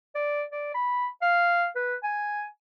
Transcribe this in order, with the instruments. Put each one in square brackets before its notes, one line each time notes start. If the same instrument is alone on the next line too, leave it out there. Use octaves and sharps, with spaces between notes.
[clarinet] D5
D5
B5
F5
B4
G#5